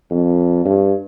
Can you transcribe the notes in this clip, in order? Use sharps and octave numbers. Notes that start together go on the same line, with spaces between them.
F2
G2